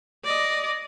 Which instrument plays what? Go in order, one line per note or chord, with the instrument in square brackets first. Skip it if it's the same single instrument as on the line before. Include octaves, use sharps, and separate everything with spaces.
[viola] D5 D#5